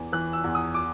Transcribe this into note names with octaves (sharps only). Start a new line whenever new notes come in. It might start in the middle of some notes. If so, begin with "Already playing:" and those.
Already playing: E2 E3
E3 F#6
E6
E2
D#6
D6